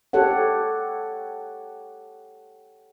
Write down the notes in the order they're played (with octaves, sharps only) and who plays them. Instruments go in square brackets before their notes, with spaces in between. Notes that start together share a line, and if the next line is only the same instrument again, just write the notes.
[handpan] G4 A4 C#5 F#5